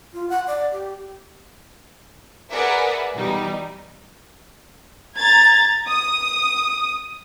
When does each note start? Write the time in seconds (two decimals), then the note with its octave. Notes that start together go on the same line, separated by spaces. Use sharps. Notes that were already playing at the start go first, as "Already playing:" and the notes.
0.13 F4
0.30 F#5
0.47 D5
0.72 G4
2.51 G#4 A#4 B4 D5 E5 F#5
3.14 B2 E3 G3 D#4
5.17 A#5 G#6 A6
5.87 D#6